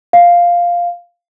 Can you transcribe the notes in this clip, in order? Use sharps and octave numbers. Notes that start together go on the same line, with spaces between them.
F5